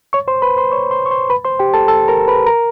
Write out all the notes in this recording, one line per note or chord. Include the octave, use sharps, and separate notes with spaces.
C#5 C#6
C5 C6
B4 B5
C5 C6
C#5 C#6
C5 C6
C#6
C5 C6
B4 B5
C5 C6
G4 G5
A4 A5
A4 A5
A#4 A#5
B4 B5
A#4 A#5